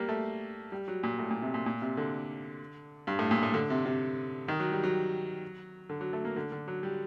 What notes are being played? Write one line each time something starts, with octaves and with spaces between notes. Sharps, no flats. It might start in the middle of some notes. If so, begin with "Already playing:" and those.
Already playing: G3 A#3
A3
G3
F#3
A#2
A2
A#2
C3
A#2
A#2
C3
D3
G2
A2
A#2
A2
D3
C3
C3
D#3
F#3
G3
F#3
D3
F#3
A3
A#3
D3
D3
F#3
G3